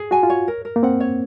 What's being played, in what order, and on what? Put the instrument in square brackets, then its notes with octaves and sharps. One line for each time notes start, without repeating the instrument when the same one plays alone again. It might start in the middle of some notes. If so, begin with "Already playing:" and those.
Already playing: [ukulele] G#4
[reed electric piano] F#4 [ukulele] G#5
[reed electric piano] F4
[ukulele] C#5
A#4
A#4
[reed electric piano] A#3
[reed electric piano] C4 [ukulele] F#5
[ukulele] C#5